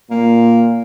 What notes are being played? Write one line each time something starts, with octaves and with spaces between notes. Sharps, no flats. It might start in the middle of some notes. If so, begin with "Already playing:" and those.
A#2 A#3